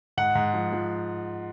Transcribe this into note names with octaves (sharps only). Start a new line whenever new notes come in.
G#2 F#5
G#2
F3
F3